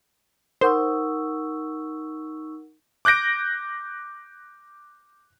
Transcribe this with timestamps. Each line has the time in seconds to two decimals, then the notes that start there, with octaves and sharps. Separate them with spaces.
0.61 D#4 A#4 C5 F#5 C#6 E6
3.05 D6 F#6 G6 A#6 D7